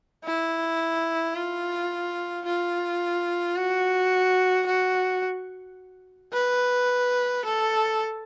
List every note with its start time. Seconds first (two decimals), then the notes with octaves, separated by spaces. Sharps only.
0.24 E4
1.35 F4
2.45 F4
3.56 F#4
4.66 F#4
6.33 B4
7.44 A4